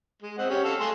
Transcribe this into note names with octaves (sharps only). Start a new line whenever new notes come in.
G#3
C4 D#5 F#5
C#4 G4
A4 F5 A5
A3 G#4 C6